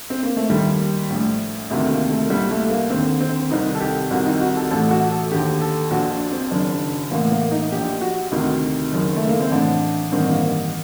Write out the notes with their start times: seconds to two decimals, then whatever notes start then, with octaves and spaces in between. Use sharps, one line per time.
0.10 C4
0.23 A#3
0.37 A3
0.50 D#2 D#3 G3
1.10 A#1 A2
1.70 D2 C3 D#3 A3
1.91 A#3
2.10 A3
2.30 C2 A#2 G3
2.51 A3
2.70 A#3
2.90 D#2 D3 C4
3.21 C4
3.51 C2 C3 D#3 D#4
3.75 A4
3.81 G4
4.11 C2 C3 D#3 F#4
4.26 D#4
4.41 F#4
4.56 A4
4.70 A1 A2 A4
4.91 F#4
5.11 A4
5.31 D#2 D3 G4
5.61 A4
5.91 A#1 A#2 F#4
6.11 D4
6.31 C4
6.51 F#1 F#2 D#3 D4
7.11 A1 A2 A#3
7.32 A#3
7.51 D#4
7.72 A#1 A#2 G4
8.01 F#4
8.32 D2 C3 D#3 D#4
8.92 F#1 F#2 D#3
9.17 A3
9.28 A#3
9.41 C4
9.51 A1 A2 D4
10.12 A1 G2 D#3 C4
10.32 A#3